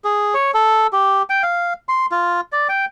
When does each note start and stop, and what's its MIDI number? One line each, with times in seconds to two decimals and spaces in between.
0.04 0.34 68
0.34 0.51 73
0.54 0.87 69
0.93 1.22 67
1.30 1.43 79
1.43 1.73 77
1.89 2.06 84
2.12 2.41 65
2.52 2.68 74
2.69 2.85 79